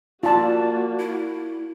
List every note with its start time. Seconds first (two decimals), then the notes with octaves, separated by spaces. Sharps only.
0.23 A#3 F4 F#4 D5 A5
0.99 E4